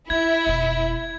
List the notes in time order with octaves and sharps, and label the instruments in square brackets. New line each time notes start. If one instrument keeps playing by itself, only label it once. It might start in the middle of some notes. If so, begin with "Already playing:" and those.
[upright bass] D#4 [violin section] E4 [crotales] G#6
[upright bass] F1 B2